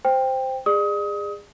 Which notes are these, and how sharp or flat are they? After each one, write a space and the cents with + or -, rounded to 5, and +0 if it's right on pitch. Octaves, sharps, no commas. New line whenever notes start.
C5 -5 G5 +10
G#4 -25 D5 +30 D#6 +30